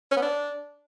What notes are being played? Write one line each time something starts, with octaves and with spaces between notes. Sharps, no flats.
C#4
B3
D4